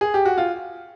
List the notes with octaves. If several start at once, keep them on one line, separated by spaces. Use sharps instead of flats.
G#4
G4
F#4
F4